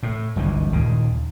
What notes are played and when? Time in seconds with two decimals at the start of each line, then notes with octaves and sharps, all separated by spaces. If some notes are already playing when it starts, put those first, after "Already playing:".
0.03 A2
0.36 G1 C#2 D#3 E3
0.73 D#2 A#2 C#3